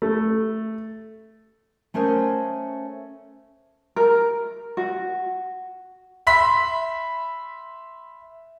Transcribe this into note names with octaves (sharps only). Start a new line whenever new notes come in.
A3
A3 C#4 A#4 C5 D#5
A#4
F#4
E5 B5 C6 B6